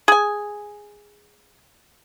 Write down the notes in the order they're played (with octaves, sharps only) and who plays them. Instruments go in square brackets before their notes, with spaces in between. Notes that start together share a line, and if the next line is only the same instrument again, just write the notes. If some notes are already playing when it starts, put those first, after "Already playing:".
[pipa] G#4 G#5